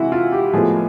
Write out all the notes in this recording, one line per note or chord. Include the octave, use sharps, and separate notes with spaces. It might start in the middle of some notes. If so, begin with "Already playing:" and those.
Already playing: C3 E3 G#3 E4 F#4
F4
G4
A2 F3 G#3 B3 G#4